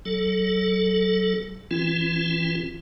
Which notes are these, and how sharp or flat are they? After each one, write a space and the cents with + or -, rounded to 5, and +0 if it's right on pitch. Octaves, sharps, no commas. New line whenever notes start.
F#3 +20 A4 +0
E3 +15 C4 +30 F4 -35